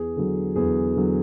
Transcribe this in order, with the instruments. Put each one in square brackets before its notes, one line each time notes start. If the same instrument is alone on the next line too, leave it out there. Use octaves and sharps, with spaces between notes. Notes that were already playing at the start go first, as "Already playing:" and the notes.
Already playing: [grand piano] E2 G#4
D3 F#3
E2 G#4
D3 F#3